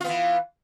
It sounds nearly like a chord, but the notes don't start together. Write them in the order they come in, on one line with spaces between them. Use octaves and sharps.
F4 B3 E3